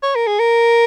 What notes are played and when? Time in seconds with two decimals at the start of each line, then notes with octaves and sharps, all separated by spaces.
0.03 C#5
0.15 A#4
0.27 G#4
0.39 A#4